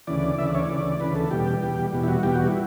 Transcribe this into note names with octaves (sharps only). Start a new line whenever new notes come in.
D2 C#3 E3 D5
D2 C#3 E3 E5
D5
C#5
D5
D2 C#3 E3
D2 C#3 E3 B4
A4
E2 B2 G3 G4
E2 B2 G3
E2 B2 G3
E4
F#4
E2 B2 G3 G4
F#4
E4